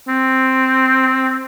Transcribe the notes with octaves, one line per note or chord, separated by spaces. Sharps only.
C4